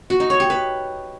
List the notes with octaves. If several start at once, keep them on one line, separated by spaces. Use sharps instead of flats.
F#4
D#4
C#5
G4
B4